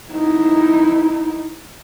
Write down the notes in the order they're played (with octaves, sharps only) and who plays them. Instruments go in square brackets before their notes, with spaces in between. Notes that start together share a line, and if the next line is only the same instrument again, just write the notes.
[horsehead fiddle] D#4 E4